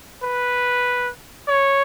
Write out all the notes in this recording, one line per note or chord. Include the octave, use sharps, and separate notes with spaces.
B4
C#5